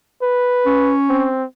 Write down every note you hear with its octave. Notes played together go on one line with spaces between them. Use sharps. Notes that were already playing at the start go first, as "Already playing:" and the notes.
B4
C#4
C4